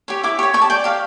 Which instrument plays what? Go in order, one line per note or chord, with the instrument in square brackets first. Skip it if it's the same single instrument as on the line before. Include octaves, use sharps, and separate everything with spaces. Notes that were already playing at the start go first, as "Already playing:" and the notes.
[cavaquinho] G4 C#5
E4 D6
G4 C#6
C#5
G4 C#6
A5
D5 G5
G4 F5